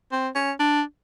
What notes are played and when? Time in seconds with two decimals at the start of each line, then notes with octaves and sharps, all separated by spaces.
0.12 C4
0.35 C#4
0.60 D4